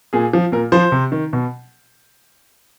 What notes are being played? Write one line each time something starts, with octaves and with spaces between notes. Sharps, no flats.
A#2 G#4
F3
A#2 A#4
F3 C5
C3
D#3
B2